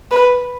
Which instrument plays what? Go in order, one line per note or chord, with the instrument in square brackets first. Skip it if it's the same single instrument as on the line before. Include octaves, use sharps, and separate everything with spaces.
[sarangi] B4